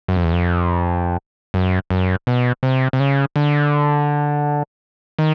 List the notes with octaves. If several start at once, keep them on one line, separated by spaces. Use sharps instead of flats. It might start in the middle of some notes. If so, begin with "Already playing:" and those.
F#2
F2
E2
F2
F#2
F#2
B2
C3
C3
C#3
D3
D#3